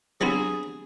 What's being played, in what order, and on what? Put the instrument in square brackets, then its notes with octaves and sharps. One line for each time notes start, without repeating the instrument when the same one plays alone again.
[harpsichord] F#3 B3 F4 [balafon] C4 D4 G4 [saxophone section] G#4